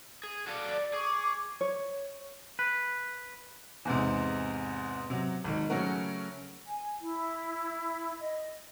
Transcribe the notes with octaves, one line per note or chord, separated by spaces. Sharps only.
G#4
F#4 A4 D5 F5
G#4 C#6 D6
C#5
B4
E2 G#2 C3
C3 F#3
G#1 D#3
C#3 F#3 A3 C#4 F#4 A#4
G#5
E4
D#5